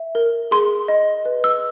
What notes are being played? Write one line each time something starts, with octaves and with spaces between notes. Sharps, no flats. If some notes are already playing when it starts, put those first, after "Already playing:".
Already playing: E5
A#4
G#4 C6
D#5
B4
E6